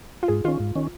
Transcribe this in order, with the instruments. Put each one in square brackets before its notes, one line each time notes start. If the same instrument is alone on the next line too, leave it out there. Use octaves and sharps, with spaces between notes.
[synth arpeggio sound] F4
[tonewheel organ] G#2 [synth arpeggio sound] G#4
[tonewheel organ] D#3 C#4 [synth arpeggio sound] F4
[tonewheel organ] G#2
D#3 C#4